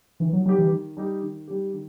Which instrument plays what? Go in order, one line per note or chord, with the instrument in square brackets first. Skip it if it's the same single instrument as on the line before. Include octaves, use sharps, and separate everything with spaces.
[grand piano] D#3 [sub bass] E3
[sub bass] F#3
[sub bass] F#3 [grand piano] G3 D#4 G4
[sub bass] E3
[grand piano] D#3
G3 D#4 G4
D#3
G3 D#4 G4
D#3